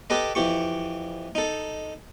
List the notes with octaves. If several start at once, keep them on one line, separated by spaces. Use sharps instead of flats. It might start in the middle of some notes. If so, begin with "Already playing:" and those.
G4 A4 B4 D#5
F2 E3 G4 C#6
D#4 A4